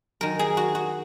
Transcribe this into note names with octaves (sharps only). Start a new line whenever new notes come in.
F#2 D#3 A#4
G#4
F#4
F#4